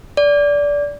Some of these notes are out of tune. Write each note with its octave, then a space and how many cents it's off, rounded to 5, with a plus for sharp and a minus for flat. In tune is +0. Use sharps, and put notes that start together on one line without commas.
D5 -20